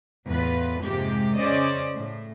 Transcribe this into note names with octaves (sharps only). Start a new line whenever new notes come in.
E2 A2 F4 B4
F2 G#2 C3 G#3 A#3 G4
C#3 C#4 C5 D5 D#5
A2